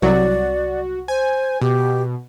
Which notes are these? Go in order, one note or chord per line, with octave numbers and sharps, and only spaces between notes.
C2 F#3 F#4 D5
C5 G#5
B2 G4